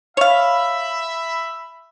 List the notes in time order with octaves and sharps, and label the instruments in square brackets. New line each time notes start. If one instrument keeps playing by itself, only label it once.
[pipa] C#5 F5 [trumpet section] E5 B5